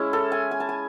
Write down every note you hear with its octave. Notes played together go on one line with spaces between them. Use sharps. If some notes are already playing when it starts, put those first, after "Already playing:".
Already playing: G#3 C#4 E4
A4
G#5
G#5
A5
G#5